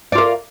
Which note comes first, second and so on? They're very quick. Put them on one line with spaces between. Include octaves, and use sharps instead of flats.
D5 F4 A#4